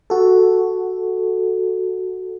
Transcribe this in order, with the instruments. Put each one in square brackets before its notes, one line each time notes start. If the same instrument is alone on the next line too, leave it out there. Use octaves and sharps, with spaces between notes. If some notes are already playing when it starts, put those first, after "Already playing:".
[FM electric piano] F#4 A4